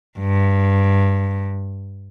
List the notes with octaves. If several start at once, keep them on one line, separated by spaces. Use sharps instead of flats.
G2